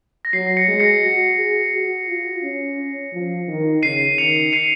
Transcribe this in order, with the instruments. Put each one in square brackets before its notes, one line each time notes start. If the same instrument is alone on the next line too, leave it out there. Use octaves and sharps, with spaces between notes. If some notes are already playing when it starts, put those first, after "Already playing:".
[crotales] A#6
[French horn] F#3 [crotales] C7
[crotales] A#6 C#7
[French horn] G#3
[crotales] A#6 C#7
[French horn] F#4
G#4
F#4
F4
C#4
F3
D#3
[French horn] C#3 [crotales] C7 D#7
[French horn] D#3 [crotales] C#7 F7
[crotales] C7 D#7